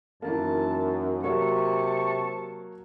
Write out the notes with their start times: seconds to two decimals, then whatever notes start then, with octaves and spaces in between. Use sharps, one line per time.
0.22 F#2 D#3 E3 A#3 A5
1.23 C3 F#3 A#3 C#5 A5 C#6